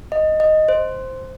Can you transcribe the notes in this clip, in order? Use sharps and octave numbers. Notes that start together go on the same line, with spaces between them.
D#5
D#5
C5